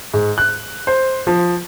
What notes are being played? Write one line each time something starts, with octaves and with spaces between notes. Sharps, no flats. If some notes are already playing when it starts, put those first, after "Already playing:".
G#2
F#6
C5
F3